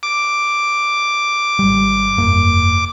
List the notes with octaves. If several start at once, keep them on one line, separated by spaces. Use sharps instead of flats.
D6
G#1 G3
F1 G2 A#3